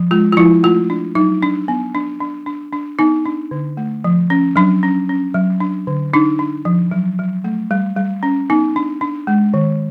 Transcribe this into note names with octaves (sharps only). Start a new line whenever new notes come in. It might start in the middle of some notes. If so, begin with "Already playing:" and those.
Already playing: F3
G#3 F4
F4
F3 E4
A3 F4
D4
F#3 D#4
D4
B3
D4
D4
D4
D4
B3 D#4
D4
D3
A3
F3
C#4
F#3 D4
C#4
C#4
F#3
D4
D3
D4 D#4
D4
F3
F#3
F#3
A3
G3
G3
C#4
B3 D#4
D4
D4
G#3
D#3